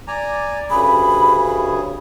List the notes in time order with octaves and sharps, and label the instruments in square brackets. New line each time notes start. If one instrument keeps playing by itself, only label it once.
[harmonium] D5 [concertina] G#5 A#5
[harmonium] D2 G2 C#3 [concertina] G#4 [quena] B5